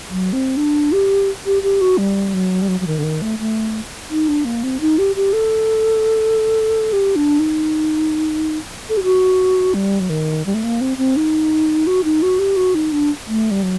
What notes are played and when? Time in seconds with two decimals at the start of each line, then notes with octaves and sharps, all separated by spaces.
0.10 F#3
0.33 C4
0.57 D4
0.92 G4
1.46 G4
1.63 G4
1.81 F#4
1.98 G3
2.34 F#3
2.62 G3
2.68 F#3
2.81 F#3
2.87 D#3
2.98 D3
3.03 D#3
3.22 A3
3.39 A3
4.10 D#4
4.28 D4
4.45 A#3
4.63 C4
4.81 D#4
4.98 G4
5.16 G4
5.33 A4
6.93 G4
7.16 D4
7.40 D#4
8.89 A4
8.97 G4
9.04 F#4
9.74 G3
10.00 F#3
10.10 D#3
10.46 G3
10.54 A3
10.64 A#3
10.81 C4
10.98 C4
11.17 D#4
11.87 F#4
12.04 D#4
12.22 F#4
12.39 G4
12.57 F#4
12.75 D#4
12.92 D4
13.27 A3
13.51 G3
13.63 F#3